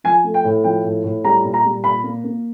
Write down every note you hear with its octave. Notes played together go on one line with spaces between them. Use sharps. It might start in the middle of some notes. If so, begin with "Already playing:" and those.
F3 G#5
A3
G5
A2
F3 G5
A2
A2
G3 A#5
A#2
A#5
G3
A#2 B5
A#3
A#3